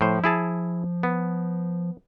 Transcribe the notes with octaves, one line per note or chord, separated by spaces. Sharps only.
A2 F3 C5
E4 G#4 A5
B3